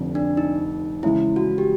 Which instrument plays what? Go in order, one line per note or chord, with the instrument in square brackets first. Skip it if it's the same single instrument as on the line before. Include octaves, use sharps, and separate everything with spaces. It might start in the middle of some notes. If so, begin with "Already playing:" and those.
Already playing: [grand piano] F1 F2 D3
[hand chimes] D4
D#4
[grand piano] C#3 E3 G#3 [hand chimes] E4
[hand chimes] F#4
G4